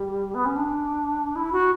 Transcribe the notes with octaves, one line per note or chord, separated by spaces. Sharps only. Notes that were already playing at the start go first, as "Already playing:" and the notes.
Already playing: G3
B3
C#4
D4
E4
F#4